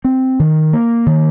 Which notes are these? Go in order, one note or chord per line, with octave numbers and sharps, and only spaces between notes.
C4
D#3
A#3
D#3